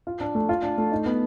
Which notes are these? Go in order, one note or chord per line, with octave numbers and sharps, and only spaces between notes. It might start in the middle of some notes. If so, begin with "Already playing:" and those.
F4
D4
A3
F4
D4
A3
D#4
B3